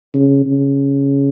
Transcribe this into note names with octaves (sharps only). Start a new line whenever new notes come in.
C#3
C#3